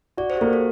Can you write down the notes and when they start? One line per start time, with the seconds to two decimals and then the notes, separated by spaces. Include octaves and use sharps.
0.17 F#4 D5
0.30 C5
0.37 G4
0.41 A#3 A4
0.53 A4